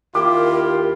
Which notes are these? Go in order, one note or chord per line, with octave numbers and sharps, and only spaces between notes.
D#2 E4 F4 G4 A#4 D6